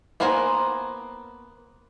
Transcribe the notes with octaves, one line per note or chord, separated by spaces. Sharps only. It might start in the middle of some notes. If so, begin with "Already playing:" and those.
A#3 B3 A#4 C5 G#5